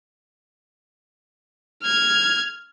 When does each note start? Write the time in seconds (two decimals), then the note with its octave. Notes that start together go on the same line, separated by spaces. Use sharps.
1.83 F6 G#6